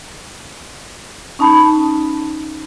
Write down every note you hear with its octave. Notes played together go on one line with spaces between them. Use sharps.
C#4 D#4 A5 B5